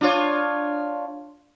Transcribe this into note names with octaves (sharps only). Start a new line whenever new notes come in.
D4 F4 C#5